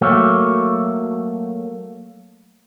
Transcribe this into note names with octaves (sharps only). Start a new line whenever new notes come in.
F#3 A3 A#3